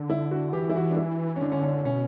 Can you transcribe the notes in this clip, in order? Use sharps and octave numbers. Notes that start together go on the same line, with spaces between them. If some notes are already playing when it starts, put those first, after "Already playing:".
Already playing: D3
E4
F#4
E3 G4
E4
F#4
D4
E4
C#4
D3 D4
C#4
C#4
B2 C#4